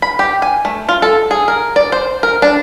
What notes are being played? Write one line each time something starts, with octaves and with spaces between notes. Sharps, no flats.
B5
G4
G#5
A3
F4
A4
G#4
A#4
D5
C5
A#4
D4